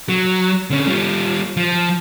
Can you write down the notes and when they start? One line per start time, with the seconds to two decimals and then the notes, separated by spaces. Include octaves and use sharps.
0.09 F#3
0.70 D3 C#4
0.88 G3 F4
1.57 F3